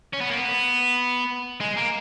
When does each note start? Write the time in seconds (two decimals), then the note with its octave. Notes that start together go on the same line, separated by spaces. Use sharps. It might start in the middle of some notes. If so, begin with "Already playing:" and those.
0.14 C#4
0.21 B3
0.30 A#3
0.37 B3
1.60 G#3
1.77 A#3